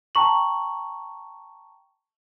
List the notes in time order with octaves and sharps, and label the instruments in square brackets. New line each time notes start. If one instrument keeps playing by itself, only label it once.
[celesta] G5 A5 A#5 C#6 F#7